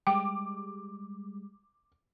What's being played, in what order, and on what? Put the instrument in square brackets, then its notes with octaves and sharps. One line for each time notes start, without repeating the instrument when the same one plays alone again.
[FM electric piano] G3 G#3 [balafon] G5 [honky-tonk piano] D6